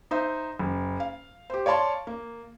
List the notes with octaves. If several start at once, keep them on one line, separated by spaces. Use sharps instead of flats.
D#4 C5 E5
F#1
F5
G4 C5
C#5 D5 F5 A5 C6
A#3